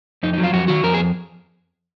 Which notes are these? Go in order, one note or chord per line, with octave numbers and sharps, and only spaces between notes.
F2 D#4
D#4
F#3
F4
F2 F#4
D#3 F#4
F2 A#4
G#4